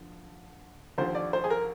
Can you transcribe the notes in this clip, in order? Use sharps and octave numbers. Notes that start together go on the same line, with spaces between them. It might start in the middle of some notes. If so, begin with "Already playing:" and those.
Already playing: D3 F3
D#2 D3 F3 C5
D5
C5
G#4
A#4